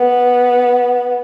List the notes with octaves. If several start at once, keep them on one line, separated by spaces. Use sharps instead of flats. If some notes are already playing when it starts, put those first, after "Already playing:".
Already playing: B3